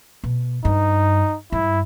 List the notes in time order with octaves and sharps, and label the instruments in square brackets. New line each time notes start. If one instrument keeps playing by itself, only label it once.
[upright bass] B2
[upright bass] G2 [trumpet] D#4
[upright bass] G2 [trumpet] E4